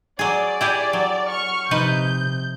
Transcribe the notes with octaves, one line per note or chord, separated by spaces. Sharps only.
F#3 G#4 D5
E4 G4 G#4
F#3
C#6 F6
C3 F3 D#4 B4 G6